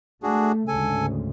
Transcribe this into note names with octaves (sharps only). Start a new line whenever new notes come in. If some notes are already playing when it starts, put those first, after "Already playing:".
A3 D4 F#4 G#4
D2 G#2 C#3 A4 G#5